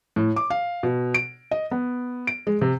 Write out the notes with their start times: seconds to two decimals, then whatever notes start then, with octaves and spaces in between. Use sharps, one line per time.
0.16 A2
0.36 D6
0.50 F5
0.83 B2
1.14 D7
1.51 D#5
1.71 B3
2.27 D7
2.47 G#3
2.61 C3